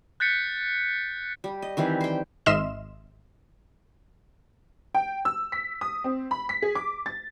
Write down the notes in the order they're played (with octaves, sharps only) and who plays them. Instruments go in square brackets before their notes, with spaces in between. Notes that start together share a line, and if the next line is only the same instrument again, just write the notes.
[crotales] F#6 G6 A6 B6 C#7
[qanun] G3
D#5
D#3 E3 G3 C4
C5 G5
[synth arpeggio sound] G#1 D#5 E5 C6 F6 E7
[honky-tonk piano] G5
E6
B6
D#6
C4
B5
B6
G#4
D6
A6